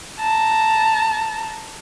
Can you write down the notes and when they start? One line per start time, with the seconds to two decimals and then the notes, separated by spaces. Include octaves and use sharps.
0.19 A5 A#5